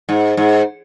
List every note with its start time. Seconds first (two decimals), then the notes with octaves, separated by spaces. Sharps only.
0.09 G#2
0.37 G#2